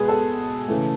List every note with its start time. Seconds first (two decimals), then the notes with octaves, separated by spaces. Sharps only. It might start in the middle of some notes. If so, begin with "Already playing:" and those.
Already playing: B2 G#3 G#4 B4
0.08 A4
0.68 C#3 E3 A3